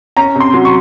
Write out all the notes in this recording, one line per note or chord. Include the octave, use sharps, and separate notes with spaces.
C#4 A#5
C3
C6
F#3
C#6